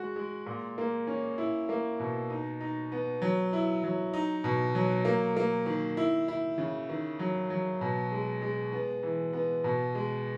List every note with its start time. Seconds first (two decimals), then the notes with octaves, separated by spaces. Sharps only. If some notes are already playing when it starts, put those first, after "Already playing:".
Already playing: G#3 F#4
0.16 G#3
0.46 A#2
0.78 A#3
1.07 C#4
1.38 E4
1.69 A#3
2.00 B2
2.30 D#4
2.61 D#4
2.92 B3
3.22 F#3
3.53 E4
3.84 F#3
4.13 D#4
4.44 B2
4.75 F#3
5.05 A#3
5.37 A#3
5.66 D#3
5.97 E4
6.28 E4
6.58 C#3
6.89 D#3
7.19 F#3
7.50 F#3
7.81 B2
8.12 G#3
8.42 G#3
8.72 B3
9.03 E3
9.33 B3
9.64 B2
9.95 G#3